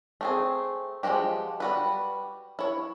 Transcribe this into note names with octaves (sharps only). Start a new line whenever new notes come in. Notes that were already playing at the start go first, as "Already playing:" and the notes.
A3 C4 G#4
F3 G#3 C4 F#4 G4
G3 F#4 B4
E4 C#5